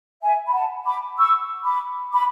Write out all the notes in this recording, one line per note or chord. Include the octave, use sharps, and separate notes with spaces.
E5 G#5
B5
F#5 A5
B5 D6
C#6 E6
B5 D6
B5 D6